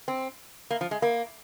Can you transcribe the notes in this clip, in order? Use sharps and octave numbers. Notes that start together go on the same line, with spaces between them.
C4
A#3
F3
G#3
A#3